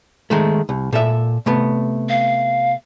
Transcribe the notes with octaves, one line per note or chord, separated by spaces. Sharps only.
D#3 G#3 A3
C2
A#2 A4 E5
C3 A3 B3
F5